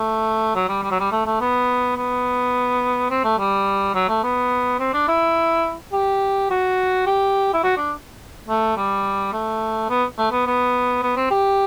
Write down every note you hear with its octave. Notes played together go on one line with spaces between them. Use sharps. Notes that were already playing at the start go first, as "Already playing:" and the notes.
Already playing: A3
F#3
G3
G3
F#3
G3
A3
A3
B3
B3
C4
A3
G3
F#3
A3
B3
C4
D4
E4
G4
F#4
G4
E4
F#4
D4
A3
G3
A3
B3
A3
B3
B3
B3
C4
G4